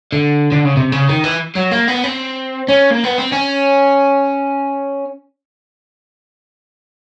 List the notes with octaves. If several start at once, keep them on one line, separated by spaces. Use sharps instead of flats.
D3
D3
C#3
C3
C#3
D#3
E3
F#3
A#3
B3
C4
C#4
A#3
B3
C4
C#4